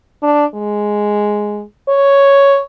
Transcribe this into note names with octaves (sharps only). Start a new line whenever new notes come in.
D4
G#3
C#5